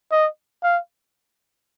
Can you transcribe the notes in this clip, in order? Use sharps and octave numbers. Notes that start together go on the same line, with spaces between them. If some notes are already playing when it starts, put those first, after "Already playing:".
D#5
F5